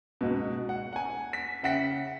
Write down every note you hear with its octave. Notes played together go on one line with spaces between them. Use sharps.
C#2 G#2 B2
F#5
F#5 G#5
B6
C#3 E5 F#5 G5 B6